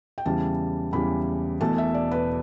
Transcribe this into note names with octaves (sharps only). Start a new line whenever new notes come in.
G5
E2 C#3 E3 G3 A5
E2 C#3 E3 G3 B5
E1 E2 B2 A3 A5
E5
D5
B4